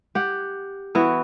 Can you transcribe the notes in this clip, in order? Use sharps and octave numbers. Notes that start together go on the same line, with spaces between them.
G4 F#5
E3 B3 E4 F#4